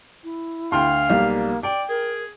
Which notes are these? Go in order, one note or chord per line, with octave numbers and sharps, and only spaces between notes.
E4
D2 F5 G5 C6
B1 G3 A#3
D5 G5
G#4 A#4